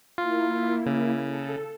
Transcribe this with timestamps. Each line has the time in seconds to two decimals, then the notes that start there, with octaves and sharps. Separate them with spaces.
0.18 A#3 E4 F4
0.86 C#3
1.26 A4